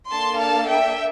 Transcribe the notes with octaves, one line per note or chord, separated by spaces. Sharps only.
A#3 D4 A4 A5 C6
F5 A5
E5 G5